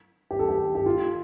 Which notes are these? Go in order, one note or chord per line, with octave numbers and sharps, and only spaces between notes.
G4
A4
G4
G4
F4